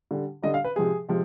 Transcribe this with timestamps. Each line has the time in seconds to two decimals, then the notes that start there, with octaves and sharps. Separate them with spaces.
0.11 D3 G3
0.42 D3 G3 D#5
0.54 F5
0.64 B4
0.76 C3 F3 G#3 G#4
1.09 C3 F3 G#3